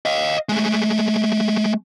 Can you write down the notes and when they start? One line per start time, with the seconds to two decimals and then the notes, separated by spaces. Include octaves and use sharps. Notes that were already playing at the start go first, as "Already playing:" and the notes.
0.06 D#5 F5
0.49 G#3 A3